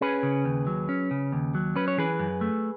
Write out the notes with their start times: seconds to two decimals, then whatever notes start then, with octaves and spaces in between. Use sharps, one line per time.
0.01 C#4 G#4 B4
0.23 C#3
0.45 D#2
0.67 F#3
0.89 C#4
1.11 C#3
1.32 D#2
1.55 F#3
1.76 C#4 B4
1.88 C#5
1.98 E3 G#4 B4
2.19 F#2
2.41 A3